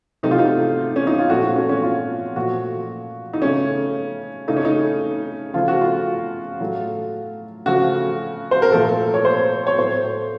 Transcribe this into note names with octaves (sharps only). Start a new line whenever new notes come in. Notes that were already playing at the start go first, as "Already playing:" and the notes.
C3 F#3 A3 D#4
F4
D#4
C#4
D#4
F4
A#2 F3 A3 F#4
F#4
C#4
C#4
F4
A#2 F3 A3 F#4
D#4
C#3 A3 C#4
C#3 A3 D#4
C#4
D#4
C#3 F3 A3 F4
F#4
F4
A2 F#3 A3
C#3 F3 A3 F#4
C5
A#4
A#2 F3 A3 A4
C#5
C5
C#5
A2 F#3 A3 C5